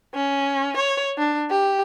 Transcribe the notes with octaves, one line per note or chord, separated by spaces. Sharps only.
C#4
C#5
D4
G4